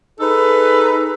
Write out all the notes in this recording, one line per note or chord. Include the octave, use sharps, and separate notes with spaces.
D#4 G#4 A4 B4